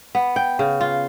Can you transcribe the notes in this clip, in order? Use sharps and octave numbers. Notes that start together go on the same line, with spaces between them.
B3
G5
C#3
F4